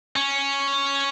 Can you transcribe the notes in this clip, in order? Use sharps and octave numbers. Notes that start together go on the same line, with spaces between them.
C#4